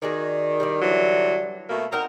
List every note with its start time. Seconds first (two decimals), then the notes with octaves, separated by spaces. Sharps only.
0.02 D#3 F#4 G#4 D5
0.60 G3 E4 D5
0.82 D3 E3 F#3
1.69 B2 A3 A#3
1.92 C4 D#4 A#4 F#5